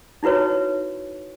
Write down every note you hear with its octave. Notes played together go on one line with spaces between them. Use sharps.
D#4 E4 F#4 B4 C#5